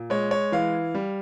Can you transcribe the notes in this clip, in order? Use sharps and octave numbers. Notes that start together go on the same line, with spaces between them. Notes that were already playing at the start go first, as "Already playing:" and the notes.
Already playing: A#2
G#3 C#5
C#5
E3 F5
G3